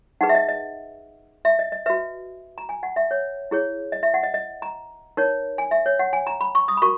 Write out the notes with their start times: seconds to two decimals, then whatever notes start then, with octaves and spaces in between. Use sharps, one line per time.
0.21 D#4 G#4 B4 F#5
0.29 E5
0.35 D#5
0.48 D#5
1.45 E5
1.59 D#5
1.72 D#5
1.86 F#4 B4 E5
2.58 A#5
2.69 G#5
2.83 F#5
2.96 E5
3.11 C#5
3.51 E4 G#4 C#5
3.92 D#5
4.03 E5
4.14 F#5
4.23 D#5
4.34 D#5
4.62 A#5
5.17 D#4 A#4 C#5
5.58 G#5
5.71 E5
5.86 C#5
5.99 F#5
6.13 G#5
6.27 A#5
6.41 B5
6.55 C#6
6.68 D#6
6.77 B5
6.82 F#4 A#4 C#6